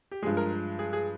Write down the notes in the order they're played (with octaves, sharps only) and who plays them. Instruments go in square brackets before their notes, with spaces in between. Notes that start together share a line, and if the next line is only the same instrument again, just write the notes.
[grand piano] G4
G2 F3 G#3 G#4
A#4
G#4
G#4